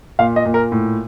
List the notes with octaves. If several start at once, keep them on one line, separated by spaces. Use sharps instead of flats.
A#2 F5
D#5
A#2
A#4
A2